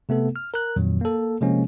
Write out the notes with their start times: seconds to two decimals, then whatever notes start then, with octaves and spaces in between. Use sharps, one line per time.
0.09 C3 A3 B3 A4
0.36 F6
0.54 A#4 F#6
0.76 F2 A#2 D#3 F#3
1.01 A#3 A4
1.41 C3 F3 G#3 A#3 C#4